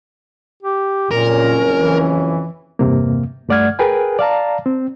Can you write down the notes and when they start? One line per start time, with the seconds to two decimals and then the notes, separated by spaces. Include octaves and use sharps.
0.63 G4
1.11 F#1 F2 A#2 C#4 A#4
1.75 E3
2.79 E2 G2 C3 A#3
3.49 G2 A3 D5 F#5 F6 G#6
3.79 G#4 A#4 B4 G5 G#5
4.19 D5 F5 A5 A#5
4.66 C4